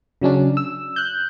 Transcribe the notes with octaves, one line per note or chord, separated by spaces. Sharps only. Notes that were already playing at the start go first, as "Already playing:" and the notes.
C#3 F#3 C#4 D4
E6
F#6 G6